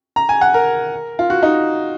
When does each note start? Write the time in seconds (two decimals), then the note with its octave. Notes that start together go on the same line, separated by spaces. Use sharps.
0.16 A#5
0.29 G#5
0.41 F#5
0.54 A#4
1.19 F4
1.30 F#4
1.43 D#4